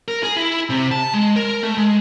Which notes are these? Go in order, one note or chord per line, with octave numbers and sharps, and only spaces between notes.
A#4
G#4
E4
C3
A5
G#3
A#4
A3
G#3